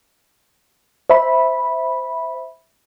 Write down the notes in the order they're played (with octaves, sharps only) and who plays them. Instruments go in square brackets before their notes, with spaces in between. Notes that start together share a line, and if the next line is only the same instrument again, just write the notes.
[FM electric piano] C5 E5 B5